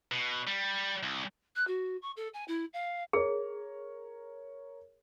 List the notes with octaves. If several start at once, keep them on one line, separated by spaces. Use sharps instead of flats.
B2
G3
C2
F#6
F#4
C#6
A4
G#5
E4
F5
G#4 A#4 C#5